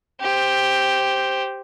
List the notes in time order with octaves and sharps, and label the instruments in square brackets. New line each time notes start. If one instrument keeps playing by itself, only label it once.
[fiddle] G4 C5